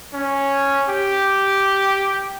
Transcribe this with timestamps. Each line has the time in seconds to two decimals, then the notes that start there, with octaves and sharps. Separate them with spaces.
0.13 C#4
0.89 G4